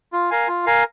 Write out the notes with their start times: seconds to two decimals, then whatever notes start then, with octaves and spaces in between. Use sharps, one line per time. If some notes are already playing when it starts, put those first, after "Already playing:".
0.13 F4
0.31 A#4 F5 G#5
0.48 F4
0.66 A#4 F5 G#5